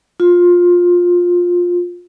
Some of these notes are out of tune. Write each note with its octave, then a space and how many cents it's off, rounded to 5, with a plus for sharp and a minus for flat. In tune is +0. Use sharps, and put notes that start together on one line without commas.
F4 +15